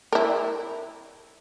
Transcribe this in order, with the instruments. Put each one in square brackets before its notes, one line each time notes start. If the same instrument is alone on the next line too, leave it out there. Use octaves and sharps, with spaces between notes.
[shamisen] E4 A#4